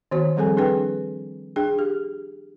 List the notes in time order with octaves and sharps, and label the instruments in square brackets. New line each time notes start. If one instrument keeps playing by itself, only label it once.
[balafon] D#3 B3 F#4 C5 C#5
F3 G3 C4 G#4 A4 G#5
D4 G#4 A4 B4 G5
D4 G#4 G5
G4